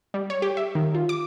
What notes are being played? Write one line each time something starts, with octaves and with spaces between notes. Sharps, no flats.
G3
C#5
G4
E5
D#3
F4
D6